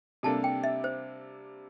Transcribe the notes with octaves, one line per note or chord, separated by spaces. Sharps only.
C3 G3 A#3 D4 A4 A5
G5
E5
C5